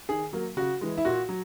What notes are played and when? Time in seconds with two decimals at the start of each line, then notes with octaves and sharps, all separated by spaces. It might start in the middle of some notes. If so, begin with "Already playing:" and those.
0.09 D#3 G#4
0.33 F#3 A#3
0.57 C#3 F#4
0.81 E3 G#3
0.97 E4
1.05 A#2 F#4
1.29 F#3